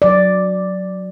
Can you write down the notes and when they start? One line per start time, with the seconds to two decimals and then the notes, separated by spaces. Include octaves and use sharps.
0.02 F#3 D5